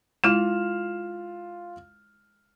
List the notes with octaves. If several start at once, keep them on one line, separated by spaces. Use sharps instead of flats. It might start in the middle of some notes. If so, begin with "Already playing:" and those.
G#3 E4 F4 F6 E7